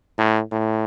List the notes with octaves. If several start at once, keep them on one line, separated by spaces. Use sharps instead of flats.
A2
A2